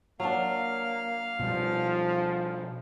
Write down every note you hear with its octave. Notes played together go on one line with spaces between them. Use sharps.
F#3 A#3 D4 F5
B2 F3 G3